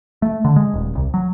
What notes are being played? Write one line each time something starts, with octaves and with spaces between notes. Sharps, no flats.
A3
D3
G#3
D#1
C2
F#3